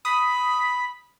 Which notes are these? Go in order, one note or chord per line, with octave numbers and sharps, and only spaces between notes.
B5 D#6